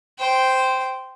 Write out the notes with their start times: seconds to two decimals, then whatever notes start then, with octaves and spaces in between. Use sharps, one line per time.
0.19 C5 G5